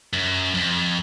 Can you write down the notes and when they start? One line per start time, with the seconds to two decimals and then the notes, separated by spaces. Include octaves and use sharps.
0.13 F#2
0.55 F2